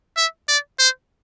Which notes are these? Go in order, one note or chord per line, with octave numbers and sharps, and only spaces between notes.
E5
D5
C5